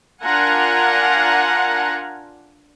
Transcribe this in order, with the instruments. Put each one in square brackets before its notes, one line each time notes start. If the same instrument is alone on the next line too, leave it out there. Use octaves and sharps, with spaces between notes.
[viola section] D4 F4 A#4 F#5 G#5 A#5